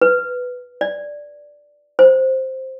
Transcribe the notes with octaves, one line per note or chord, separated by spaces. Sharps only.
B4
D5
C5